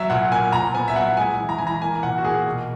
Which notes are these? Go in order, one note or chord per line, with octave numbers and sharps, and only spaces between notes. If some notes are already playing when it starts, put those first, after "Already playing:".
Already playing: F#3 E5
A#2 F#5
A#3 G#5
A#2 A#5
B3 G#5
E5
F#3 F#5
G#3 G#5
E3
A#5
E3 G#5
A#5
A#3 G#5
A#2 F#5
F#4
A#3 G#4
B2